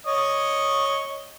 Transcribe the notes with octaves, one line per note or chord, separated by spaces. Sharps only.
C#5 D#5